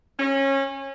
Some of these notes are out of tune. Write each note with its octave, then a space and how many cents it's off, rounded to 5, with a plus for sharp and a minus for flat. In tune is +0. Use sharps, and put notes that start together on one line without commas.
C#4 -25